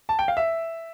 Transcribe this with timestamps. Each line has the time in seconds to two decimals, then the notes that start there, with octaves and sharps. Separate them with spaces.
0.09 A5
0.19 G5
0.28 F5
0.37 E5